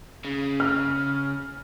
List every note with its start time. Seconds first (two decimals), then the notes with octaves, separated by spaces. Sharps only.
0.25 C#3
0.60 F6